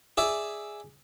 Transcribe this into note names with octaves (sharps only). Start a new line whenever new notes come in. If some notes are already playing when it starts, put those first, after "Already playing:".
G#4 D5 E5